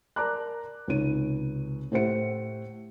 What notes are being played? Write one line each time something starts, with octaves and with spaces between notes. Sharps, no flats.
A#4 D5 A5 A#5 D6 F#6
C#2 C3 D#4 C#5 D#7
A2 G4 C5 E5 F#5 C#7